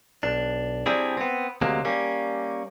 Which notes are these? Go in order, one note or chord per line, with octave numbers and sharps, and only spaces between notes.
B1 D4
C3 G3 C4 D4 E4 G#4
B3 C4
D2 C3 F#3 G#3 A#3
G3 A#3 C#4